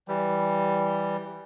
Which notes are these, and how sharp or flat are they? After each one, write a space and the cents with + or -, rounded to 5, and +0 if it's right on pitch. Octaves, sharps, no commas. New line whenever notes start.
E3 +0 G3 +0